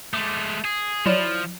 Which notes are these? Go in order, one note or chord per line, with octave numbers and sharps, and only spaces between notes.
G#3 A3 D6
G#4
F3 F#3 E4 D5